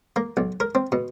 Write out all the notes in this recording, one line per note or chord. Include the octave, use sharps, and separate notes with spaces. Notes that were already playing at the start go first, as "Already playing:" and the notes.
A#3
B1
A#4
C4
B2